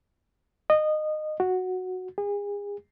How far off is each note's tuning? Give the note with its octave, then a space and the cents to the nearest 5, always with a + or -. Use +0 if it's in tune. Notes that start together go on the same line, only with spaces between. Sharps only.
D#5 -20
F#4 -5
G#4 -35